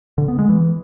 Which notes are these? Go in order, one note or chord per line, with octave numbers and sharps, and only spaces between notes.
D3
B3
G#3
E3